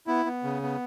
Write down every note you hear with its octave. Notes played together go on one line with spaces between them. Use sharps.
B3 E4
B3
C#3
B3